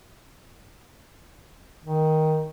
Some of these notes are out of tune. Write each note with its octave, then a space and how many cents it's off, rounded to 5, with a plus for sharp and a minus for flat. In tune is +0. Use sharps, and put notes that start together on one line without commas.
D#3 +10